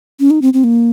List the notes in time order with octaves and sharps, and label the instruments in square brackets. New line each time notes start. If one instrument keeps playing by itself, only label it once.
[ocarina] C#4
D#4
C4
C4
A#3